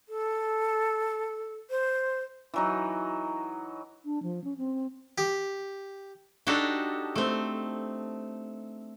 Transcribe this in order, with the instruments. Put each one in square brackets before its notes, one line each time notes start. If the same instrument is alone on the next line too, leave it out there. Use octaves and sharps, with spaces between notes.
[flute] A4
C5
[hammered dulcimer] E3 F#3 D#4
[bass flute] D4
F3
C#4
C4
[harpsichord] G4
[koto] D4 D#4 F#4 G4 A4
A3 C4